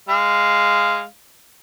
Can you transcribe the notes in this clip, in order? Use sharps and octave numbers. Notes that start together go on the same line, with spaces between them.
G#3 F5